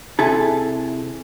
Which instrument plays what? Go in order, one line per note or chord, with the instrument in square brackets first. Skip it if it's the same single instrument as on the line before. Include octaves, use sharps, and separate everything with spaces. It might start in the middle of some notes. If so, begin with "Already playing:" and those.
[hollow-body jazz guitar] C3 E4 G#4 A4